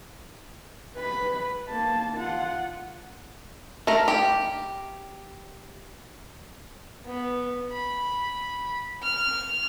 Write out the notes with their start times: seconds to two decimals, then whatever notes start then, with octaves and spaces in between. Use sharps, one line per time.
0.96 B4 B5
1.69 A#3 A5
2.17 F4 F#5
3.87 A3 A#4
4.08 G4
7.06 B3
7.72 B5
9.03 F6